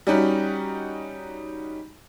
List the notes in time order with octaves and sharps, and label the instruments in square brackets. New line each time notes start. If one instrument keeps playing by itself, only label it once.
[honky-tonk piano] G3 C#4 D#4 F#4